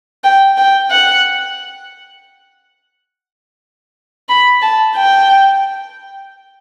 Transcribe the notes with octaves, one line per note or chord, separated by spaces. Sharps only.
G5
G5
F#5
B5
A5
G5